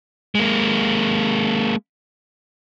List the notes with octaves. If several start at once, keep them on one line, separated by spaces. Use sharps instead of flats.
G#3 A#3